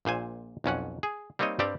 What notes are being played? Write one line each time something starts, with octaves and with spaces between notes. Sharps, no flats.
A#1 A#2 C5 G#5
B1 F2 C#4 F#5
G#4
G3 A#3 C4 D#4 C#5 D#5
G2 G3 C4 G4 D5